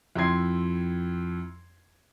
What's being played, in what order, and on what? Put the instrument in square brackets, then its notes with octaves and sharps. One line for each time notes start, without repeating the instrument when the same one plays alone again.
[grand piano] F2 E4 G5 C6 G#6 C7